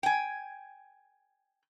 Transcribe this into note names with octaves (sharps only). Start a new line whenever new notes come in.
G5 G#5